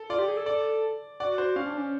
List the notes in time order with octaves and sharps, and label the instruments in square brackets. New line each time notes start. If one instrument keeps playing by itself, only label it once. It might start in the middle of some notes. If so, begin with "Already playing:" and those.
Already playing: [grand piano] A4
[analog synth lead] F4 [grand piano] D5
[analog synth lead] G4
G#4
A4
[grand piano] D5
[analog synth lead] F#4 [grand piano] D5
[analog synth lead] F#4 [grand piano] C5
[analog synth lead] C#4 [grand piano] F5
[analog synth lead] D4
C#4